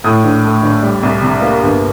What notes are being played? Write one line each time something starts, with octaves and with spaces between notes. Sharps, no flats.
A2 D#6
A#1
A3
A#1
G3
C2
C3
A#3
G1